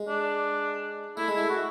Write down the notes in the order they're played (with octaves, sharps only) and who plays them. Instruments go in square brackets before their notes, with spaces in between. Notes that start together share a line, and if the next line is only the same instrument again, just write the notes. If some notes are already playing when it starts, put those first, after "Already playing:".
Already playing: [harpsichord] G#3
[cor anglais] D4
[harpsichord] A3 [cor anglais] E4
[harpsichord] G#3
[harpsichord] A3 [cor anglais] E4
[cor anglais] F#4